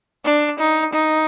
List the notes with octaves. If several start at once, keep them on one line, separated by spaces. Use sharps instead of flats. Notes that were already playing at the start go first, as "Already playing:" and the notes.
D4
D#4
D#4